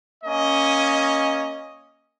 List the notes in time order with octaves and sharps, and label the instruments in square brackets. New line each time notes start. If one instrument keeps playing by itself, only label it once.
[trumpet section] A#3 C#4 D#5